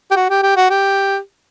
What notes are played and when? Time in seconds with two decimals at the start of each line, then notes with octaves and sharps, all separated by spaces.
0.11 G4
0.16 F#4
0.29 G4
0.43 G4
0.56 F#4
0.70 G4